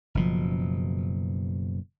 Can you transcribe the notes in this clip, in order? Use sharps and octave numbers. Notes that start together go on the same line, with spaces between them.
F#1 B2 F3